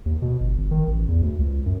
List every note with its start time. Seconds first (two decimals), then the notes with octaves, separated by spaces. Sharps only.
0.06 D#2
0.22 B2
0.40 G1
0.58 G1
0.71 D#3
0.87 A1
1.08 E2
1.22 D2
1.39 C#2
1.66 F#2